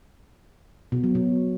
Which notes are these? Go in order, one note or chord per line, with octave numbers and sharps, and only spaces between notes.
B2
F#3
B2